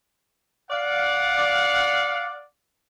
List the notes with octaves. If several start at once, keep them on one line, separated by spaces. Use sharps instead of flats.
D5 F5 F#5